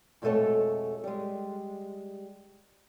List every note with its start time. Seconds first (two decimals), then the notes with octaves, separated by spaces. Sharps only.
0.22 F2 B2 G#3 A3 A4 C#5
1.04 G3 G#3